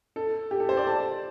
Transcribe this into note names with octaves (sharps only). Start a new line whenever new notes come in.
A4
G4
A4
C5
D5
A5